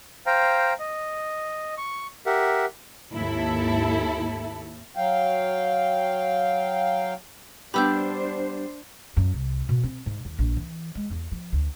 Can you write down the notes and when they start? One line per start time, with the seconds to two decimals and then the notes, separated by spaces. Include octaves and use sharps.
0.26 C5 F5 G5 A#5
0.79 D#5
1.78 C#6
2.26 G4 A#4 E5 F#5
3.11 G#1 D#2 E4 A4
4.96 F#3 F5 G5
7.74 G3 B3 D4 G4 C5 B5 E6 G6
9.17 F#2
9.34 C2
9.69 B2
9.84 C4
10.06 G#2
10.25 D#2
10.39 A#1
10.57 E3
10.95 G#3
11.10 E2
11.32 F3
11.52 D2